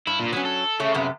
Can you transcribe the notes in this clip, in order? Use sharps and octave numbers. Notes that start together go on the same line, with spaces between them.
G2 E4
A#2
F#3 B3 C#4
A4
C#3 A3 C#5
F#2 C3 B3